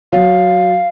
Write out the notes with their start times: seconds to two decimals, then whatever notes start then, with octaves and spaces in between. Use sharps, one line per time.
0.13 F#3 F5